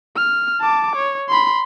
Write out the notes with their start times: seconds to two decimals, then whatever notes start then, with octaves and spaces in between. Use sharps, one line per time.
0.16 F6
0.61 A5 D6
0.96 C#5
1.29 B5 C6